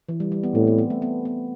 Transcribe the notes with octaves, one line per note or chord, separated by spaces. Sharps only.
E3
G3
G3
B3
A2 C4
B3
B3
A3
B3
B3